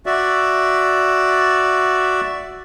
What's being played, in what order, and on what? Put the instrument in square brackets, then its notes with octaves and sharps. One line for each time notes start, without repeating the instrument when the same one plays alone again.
[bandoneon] F#4 D5 E5